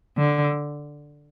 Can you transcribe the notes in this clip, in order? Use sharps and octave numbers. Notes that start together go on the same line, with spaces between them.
D3